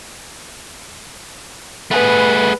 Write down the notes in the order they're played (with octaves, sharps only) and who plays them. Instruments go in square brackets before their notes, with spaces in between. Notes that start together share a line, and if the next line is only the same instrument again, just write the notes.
[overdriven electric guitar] A3 G#4 [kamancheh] B4 [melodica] F#5 B5